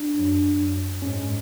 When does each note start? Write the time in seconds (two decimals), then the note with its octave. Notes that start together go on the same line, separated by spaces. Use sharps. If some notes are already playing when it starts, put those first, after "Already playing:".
Already playing: D4
0.16 F#2
0.58 F#2
1.02 G#2 C#4